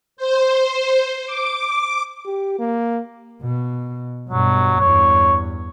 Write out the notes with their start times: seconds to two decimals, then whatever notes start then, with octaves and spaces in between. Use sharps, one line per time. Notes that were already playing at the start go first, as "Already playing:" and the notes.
0.17 C5
1.26 D6
2.26 G4
2.59 A#3
3.42 B2
4.29 G2 B2 F#3
4.80 E2 G2 C#5